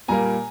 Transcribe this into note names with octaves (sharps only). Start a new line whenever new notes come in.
A#2 G3 A#3 G#5 A#5